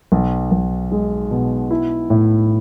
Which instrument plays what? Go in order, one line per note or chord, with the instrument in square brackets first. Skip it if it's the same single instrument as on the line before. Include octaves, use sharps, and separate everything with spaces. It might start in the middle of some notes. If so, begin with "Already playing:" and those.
[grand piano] B1
B1
G#3
B2
E4
A2